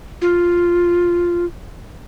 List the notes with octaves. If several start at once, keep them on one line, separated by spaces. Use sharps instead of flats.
F4